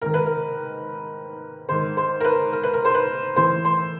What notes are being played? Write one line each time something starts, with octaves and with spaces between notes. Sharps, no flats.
G#2 D#3 A#4
B4
A#4
G#2 D#3 C5
C5
A#4
B4
A#4
B4
A#4
C5
B4
A2 E3 C5
C5